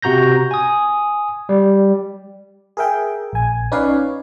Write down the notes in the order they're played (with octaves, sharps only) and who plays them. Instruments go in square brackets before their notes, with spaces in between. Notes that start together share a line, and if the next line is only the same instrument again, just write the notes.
[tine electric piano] C3 F#4 A#5 G6 A#6
G#5 D#6
G3
[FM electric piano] G#4 A#4 E5 G5
A#1 G#5
C#4 D#4 B4 C#5 D5 F5